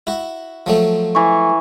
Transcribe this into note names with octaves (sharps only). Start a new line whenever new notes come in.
E4 F#4
F3 F#3 A3
E3 C#6